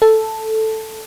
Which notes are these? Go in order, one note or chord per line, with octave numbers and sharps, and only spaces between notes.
A4